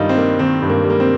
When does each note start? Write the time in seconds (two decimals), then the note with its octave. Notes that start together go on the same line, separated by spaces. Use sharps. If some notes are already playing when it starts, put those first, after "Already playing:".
Already playing: G2 D#3 G3 D#4 F4
0.09 C4
0.17 A#3
0.39 D#3 C4
0.62 G2
0.70 A#3
0.84 G3
0.90 A#3
1.00 C4